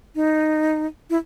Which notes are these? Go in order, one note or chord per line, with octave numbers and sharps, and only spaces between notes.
D#4
E4